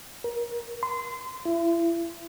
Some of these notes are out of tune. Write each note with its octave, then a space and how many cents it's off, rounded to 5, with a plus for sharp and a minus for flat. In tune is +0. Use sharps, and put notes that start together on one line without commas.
A#4 +30
C6 -25
E4 +35